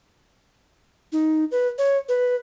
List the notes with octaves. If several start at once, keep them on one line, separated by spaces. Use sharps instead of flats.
D#4
B4
C#5
B4